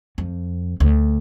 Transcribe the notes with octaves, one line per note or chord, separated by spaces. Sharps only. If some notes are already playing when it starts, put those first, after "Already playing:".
F2
D2